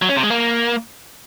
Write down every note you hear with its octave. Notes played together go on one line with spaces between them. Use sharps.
F#3
C#4
C3
G#3
A#3